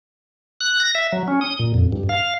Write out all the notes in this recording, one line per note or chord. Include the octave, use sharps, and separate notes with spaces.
F#6
A#6
E5
F#3
C#4
D#6
A#2
F2
G2
F5